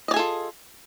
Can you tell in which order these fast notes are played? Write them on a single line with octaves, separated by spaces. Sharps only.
D#5 D5 G#4 A4 F4